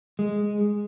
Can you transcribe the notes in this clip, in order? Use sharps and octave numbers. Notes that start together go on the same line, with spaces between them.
G#3